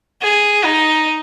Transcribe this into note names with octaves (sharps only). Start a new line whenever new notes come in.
G#4
D#4